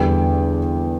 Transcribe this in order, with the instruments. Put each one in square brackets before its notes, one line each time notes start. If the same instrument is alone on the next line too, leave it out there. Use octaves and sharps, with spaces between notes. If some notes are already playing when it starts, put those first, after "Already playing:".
Already playing: [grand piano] E2 D3 G3 D4 G5